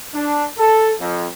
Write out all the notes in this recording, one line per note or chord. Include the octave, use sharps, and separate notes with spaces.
D4
A4
F2